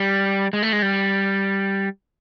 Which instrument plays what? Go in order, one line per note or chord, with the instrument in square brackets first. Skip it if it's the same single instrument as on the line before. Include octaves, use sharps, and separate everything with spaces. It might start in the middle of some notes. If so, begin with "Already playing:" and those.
Already playing: [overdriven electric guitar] G3
G#3
A3
G#3
G3